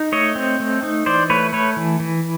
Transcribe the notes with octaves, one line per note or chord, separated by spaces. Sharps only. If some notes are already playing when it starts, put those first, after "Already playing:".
Already playing: D#4
A3 C#5 D#5
C4
A3
D#4
E3 C5 D5
A3 B4 C#5
A3 B4 C#5
E3
E3